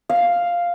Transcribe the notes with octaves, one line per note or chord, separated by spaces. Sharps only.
F5